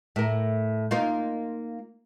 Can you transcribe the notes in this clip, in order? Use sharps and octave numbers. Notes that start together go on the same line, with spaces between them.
A2 A#4
A#3 D#4 F4